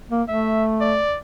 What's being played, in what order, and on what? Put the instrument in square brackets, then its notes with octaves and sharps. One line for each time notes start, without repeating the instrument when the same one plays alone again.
[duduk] A#3
[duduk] A3 [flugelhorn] E5
[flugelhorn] D5